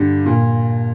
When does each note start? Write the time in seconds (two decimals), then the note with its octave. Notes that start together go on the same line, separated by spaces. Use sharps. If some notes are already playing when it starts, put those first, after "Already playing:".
Already playing: G2 D3 G4
0.26 A#2